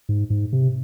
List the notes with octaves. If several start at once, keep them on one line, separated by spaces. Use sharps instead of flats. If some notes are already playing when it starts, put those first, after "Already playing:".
G#2
G#2
C3